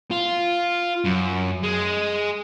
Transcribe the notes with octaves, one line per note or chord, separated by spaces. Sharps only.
F4
F#2
G#3